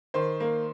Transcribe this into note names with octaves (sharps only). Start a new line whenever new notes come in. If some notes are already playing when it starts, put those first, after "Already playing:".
D#3 C5
A#3